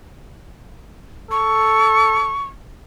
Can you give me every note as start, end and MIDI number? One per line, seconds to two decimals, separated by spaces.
1.31 2.35 69
1.31 2.44 85